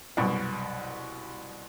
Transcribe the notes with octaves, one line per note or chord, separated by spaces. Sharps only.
C2 F#2 B2